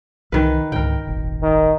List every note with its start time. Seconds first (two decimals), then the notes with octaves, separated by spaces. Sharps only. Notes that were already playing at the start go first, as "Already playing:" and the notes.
0.32 C2 D#3 E3 B4
0.72 C#2 G#2 D3 A#4 G5
1.07 D#1 G#1
1.42 D#3